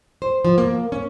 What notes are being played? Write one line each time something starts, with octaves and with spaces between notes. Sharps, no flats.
C5
F3
A#3
C#4